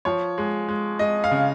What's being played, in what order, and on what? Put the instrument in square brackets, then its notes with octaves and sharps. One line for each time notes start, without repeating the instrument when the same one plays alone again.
[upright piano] F3 C#5
G#3
G#3
G#3 D#5
F5
C#3